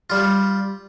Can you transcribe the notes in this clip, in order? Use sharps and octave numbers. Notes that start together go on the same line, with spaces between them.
G3 F4